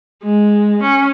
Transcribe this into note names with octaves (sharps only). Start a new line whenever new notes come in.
G#3
C#4